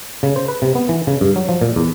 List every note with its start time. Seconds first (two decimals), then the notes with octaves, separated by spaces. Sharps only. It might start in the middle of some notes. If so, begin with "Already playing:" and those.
0.23 C#3
0.36 C5
0.48 B4
0.62 C3
0.75 B3
0.89 E3
1.07 C#3
1.21 G2
1.36 F#3
1.49 F3
1.62 A#2
1.76 E2